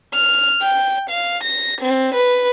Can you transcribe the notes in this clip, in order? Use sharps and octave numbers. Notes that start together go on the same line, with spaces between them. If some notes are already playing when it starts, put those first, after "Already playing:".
F6
G5
F5
A#6
C4
B4